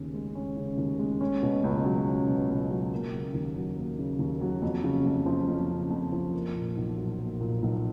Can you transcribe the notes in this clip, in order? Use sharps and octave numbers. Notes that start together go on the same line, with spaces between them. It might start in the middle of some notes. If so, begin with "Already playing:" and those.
Already playing: D#2 C#3 C#4
G#3
C#4
C#3
D#2
G#3
C#4
B2
C#2
F#3
C#4
B2
C#2
F#3
A#3
C#3
D#2
F#3
A#3
C#3
D#2
F#3
F2
C#3
F2
F3
F2
C#3
F2
F3
A#3
A#2
B1
F#3
A#3
A#2
B1